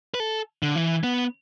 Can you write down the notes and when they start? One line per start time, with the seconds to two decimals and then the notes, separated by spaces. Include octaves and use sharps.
0.14 B4
0.20 A4
0.63 D3
0.76 E3
1.04 B3